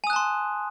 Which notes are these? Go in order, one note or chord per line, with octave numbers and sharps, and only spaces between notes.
G#5 A5 C6 D#6 F#6